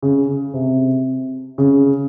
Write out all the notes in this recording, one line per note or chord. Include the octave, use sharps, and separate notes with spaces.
C#3
C3
C#3